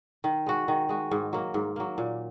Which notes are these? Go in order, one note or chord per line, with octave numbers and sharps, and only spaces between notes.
D#3
G#3 F#4
D#3
G#3 F#4
G#2
F#3 A#3
G#2
F#3 A#3
A#2